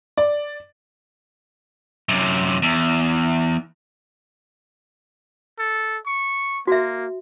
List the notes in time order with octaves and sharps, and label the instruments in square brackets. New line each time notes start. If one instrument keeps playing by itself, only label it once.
[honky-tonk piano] D5
[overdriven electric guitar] F#2 C3
E2
[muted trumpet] A4
C#6
[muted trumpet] A#3 [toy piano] F#4 E5